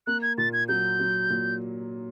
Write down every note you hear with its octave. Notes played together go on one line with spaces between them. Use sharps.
A#3 F#6
G#6
A#2 A6
G#6
F#3 G6
F#3
A#2